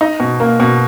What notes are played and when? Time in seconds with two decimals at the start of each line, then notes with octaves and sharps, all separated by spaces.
0.01 D#4
0.20 B2
0.40 A#3
0.60 B2